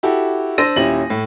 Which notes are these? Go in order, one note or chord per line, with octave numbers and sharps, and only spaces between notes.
E4 F#4 G4 A4
D4 C5 E6 A#6 D#7
D#1 C#4 E4 G4 F#7
A2